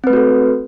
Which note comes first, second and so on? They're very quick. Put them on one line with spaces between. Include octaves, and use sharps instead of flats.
C4 B4 A3 F#4 A4